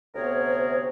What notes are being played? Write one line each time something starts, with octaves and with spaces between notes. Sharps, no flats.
D2 C3 B3 G#4 A#4 C#5